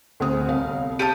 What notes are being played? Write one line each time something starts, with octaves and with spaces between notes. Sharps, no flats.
D2 C4 D#6
G1 C2 F5
G4 A5 D#6 D#7